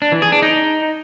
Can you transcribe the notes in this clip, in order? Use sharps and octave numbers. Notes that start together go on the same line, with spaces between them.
D4
E3
G#4
D4
D#4